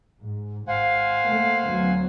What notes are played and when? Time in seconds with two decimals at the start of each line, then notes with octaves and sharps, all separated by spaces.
0.22 G#2
0.67 G#1 C5 F5 F#5 G#5
1.22 A3 A#3
1.64 D2 F#3 B3